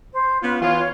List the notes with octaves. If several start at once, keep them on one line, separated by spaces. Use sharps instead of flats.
C5
B3 C#4 F4 B4
E3 B3 F4 C#5
C#5